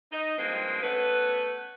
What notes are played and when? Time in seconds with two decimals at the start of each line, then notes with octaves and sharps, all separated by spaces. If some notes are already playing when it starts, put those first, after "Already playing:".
0.12 D#4
0.38 G2 F3 G#3 A#3 C4
0.83 A3 B3 C#4 B4